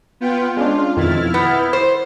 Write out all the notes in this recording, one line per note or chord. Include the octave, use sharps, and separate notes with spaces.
B3 F4 G5
G#3 C#4 D4 F4
F2 B2 D#3 E4 F6 A6
B3 G6
C5